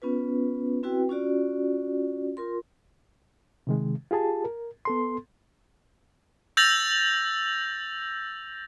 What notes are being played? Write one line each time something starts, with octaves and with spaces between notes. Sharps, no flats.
B3 C#4 F4 B4
C4 E4 F#4 B4 G5
C#4 F4 F#4 D5
F4 A#4 C6
C3 D#3 G#3
F4 G4 G#4 A5
A#4
B3 A4 C6
E6 G6 A6 A#6 F7 F#7